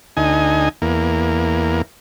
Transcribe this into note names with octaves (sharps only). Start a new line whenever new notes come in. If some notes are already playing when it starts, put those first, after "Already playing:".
D2 D#4 G#5
E2 A#3